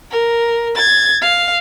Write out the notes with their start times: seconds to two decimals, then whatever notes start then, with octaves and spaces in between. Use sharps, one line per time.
0.11 A#4
0.75 G#6 A6
1.22 F5